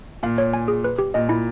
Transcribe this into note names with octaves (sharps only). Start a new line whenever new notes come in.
A#2 F5
C#5
G#5
G#4
B4
G4
A#2 D#5
A#2 E4